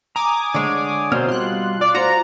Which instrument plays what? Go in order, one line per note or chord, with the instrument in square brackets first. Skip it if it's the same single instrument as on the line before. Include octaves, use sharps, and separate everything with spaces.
[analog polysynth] G#5 D6 D#6 [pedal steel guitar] A#5
[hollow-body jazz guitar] D3 G#3 [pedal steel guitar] C#5 D5
[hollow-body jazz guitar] B2 [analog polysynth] A#3 C5 [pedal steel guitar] C4 C#5 F6
[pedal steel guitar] G3 F4 [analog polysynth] C6 F#6
[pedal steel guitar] F4 [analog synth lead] D5
[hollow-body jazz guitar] F#4 C5 [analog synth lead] A#5